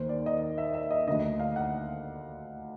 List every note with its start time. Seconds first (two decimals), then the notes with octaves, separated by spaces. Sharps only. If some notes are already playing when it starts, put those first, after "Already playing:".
Already playing: D#2 D#3 C5
0.09 D5
0.26 D#5
0.58 E5
0.74 E5
0.91 D#5
1.07 D3 D#5
1.10 D2
1.40 F5
1.56 F#5